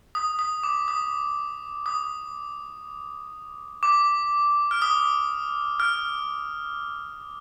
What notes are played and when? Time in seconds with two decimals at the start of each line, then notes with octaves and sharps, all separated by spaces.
0.15 D#6
0.39 D#6
0.64 D6
0.88 D#6
1.86 D#6
3.83 D6
4.71 F6
4.82 D#6
5.80 F6